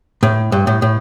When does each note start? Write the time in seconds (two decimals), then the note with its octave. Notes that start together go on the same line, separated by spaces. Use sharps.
0.23 A2
0.52 G2
0.67 A2
0.82 A2